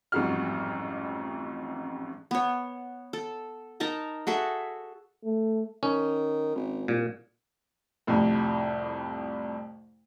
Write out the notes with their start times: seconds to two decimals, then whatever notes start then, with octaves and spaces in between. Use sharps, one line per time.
0.12 A1 F2 G#2 G3 F#4 F6
2.31 B3 C#5
3.13 A4
3.80 D#4 A#4 A5 A#5
4.27 F#4 G#4 A4 E5
5.25 A3
5.83 D#3 C#4
6.55 G#1
6.88 C2 A#2
8.07 C2 F2 A2